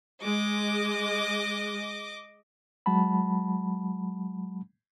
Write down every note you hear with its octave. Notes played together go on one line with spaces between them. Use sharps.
G#3 D#5 D6
F#3 G#3 F#5 A5 B5